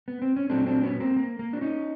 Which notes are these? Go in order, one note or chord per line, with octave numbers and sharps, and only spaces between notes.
B3
C4
C#4
A#2 F#3 A3 C4 D4
C4 D4
B3 C#4
A#3 C4
A#3
A#3
D4
C#4 D#4